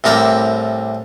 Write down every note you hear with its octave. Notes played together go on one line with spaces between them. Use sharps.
C2 A2 C4 A#4 D5 G5